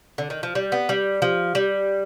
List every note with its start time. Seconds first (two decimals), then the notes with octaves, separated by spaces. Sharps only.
0.18 D3
0.30 D#3
0.43 F3
0.55 G3
0.72 B3
0.89 G3
1.22 F3
1.55 G3